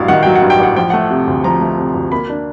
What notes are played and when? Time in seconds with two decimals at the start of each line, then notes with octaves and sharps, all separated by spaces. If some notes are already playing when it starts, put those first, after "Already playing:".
Already playing: A1 G2 F#3 F5
0.08 D#3 F#5
0.23 F#3 G5
0.35 F#5
0.42 G2
0.50 G5
0.60 A1 F#5
0.77 F3 G5
0.90 A3 F#5
1.11 C3
1.27 D2
1.44 F3 A#5
1.61 A3
1.78 C3
1.95 D2
2.12 A#3 B5
2.30 D4